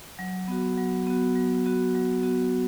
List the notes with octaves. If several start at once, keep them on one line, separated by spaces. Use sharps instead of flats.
F#3
B3 F#4
F#3
B3 F#4
F#3
B3 F#4
F#3
B3 F#4